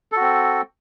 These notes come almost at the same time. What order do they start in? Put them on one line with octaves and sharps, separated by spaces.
A4 F#4 C4